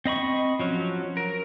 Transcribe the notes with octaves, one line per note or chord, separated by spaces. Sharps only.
C4 D#5 B5 C#6
F3 F#3 C#4
A#4